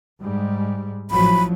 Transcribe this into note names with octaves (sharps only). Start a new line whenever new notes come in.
G#2 G3 G#3
A1 F3 F#3 B5